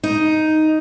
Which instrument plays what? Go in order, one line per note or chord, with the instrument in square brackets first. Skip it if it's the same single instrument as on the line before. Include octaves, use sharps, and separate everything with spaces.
[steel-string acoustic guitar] D#4